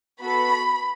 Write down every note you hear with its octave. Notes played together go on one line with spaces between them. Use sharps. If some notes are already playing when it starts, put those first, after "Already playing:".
B3 F#4 A4 B5